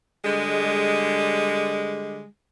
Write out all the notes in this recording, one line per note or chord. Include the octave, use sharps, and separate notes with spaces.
D3 G3 G#3